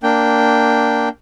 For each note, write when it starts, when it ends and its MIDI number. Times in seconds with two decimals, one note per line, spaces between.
0.03 1.09 58
0.03 1.09 62
0.03 1.09 79